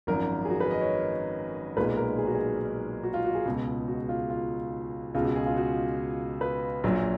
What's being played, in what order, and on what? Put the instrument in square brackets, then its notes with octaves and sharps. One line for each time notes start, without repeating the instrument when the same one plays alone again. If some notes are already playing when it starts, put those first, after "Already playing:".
[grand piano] G#1 F#2 F3 A#4
G#4
F#4
B4
D#5
C#5
B1 A#2 G#3 B4
A#4
G#4
F#4
G#4
F#4
F4
F#4
G#4
C#2 B2 G#3
F#4
F4
F4
C#2 B2 G#3 F4
F#4
G#4
F4
F#4
B4
A#1 A#2 F#3